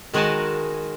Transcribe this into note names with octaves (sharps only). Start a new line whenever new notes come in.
D#3 G#3 F#4 A#4 G#5 A5